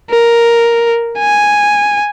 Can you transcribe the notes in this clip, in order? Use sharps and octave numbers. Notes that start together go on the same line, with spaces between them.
A#4
G#5